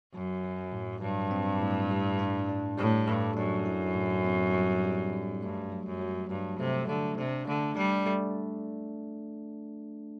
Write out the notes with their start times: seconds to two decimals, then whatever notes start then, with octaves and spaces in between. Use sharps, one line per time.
0.14 F#2 F#3
0.44 F#3
0.72 A2
1.02 G2 F#3
1.31 C4
1.61 A2
1.91 G3
2.19 D4
2.49 D4
2.78 A2 G3
3.07 G2 A4
3.37 F#2 D4
3.66 E4
3.95 A2
4.25 C4
4.54 G3
4.84 G3
5.13 G3
5.42 G2 A3
5.72 F#3
5.86 F#2
6.01 F#3
6.30 G2 F#3
6.60 C3 A3
6.89 D3 A3
7.18 C3 D4
7.48 D3 A3
7.77 G3 D4
8.06 A3